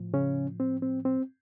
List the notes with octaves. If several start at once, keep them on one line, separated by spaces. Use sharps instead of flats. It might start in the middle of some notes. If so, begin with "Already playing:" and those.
Already playing: A2 F3
C#3 C#4
C4
C4
C4